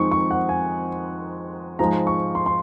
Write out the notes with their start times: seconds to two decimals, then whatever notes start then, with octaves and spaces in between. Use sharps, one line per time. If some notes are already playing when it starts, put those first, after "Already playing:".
Already playing: F2 D#3 G#3 C4 D#4 C#6
0.11 C#6
0.31 F#5
0.49 G#5
1.79 G#2 F3 G#3 A#5
2.07 C#6
2.35 C6
2.46 C6